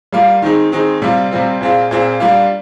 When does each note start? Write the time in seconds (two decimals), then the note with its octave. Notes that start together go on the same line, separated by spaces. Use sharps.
0.13 G3 A#3 F4
0.42 D#3 G#3 C4 D#4
0.72 D#3 G#3 C4 D#4
1.02 C3 G3 C4 F4
1.31 C3 G3 C4 F4
1.61 A#2 G#3 C4 F4
1.91 A#2 G#3 C4 F4
2.20 G3 A#3 D4 F4